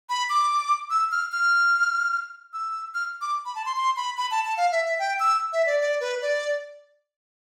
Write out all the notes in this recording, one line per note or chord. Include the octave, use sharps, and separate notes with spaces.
B5
D6
E6
F6
F6
E6
F6
D6
B5
A5
C6
C6
B5
B5
A5
A5
F5
E5
E5
G5
E6
E5
D5
D5
B4
D5